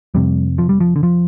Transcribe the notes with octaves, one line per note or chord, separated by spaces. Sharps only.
F2 C3 G3
F3
G3
F3
D3
F3